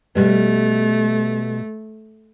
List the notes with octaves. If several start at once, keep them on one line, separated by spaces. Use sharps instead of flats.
B2 G3 A3 B3